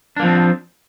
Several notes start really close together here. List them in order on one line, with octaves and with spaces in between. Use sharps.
D4 A#3 F3 C4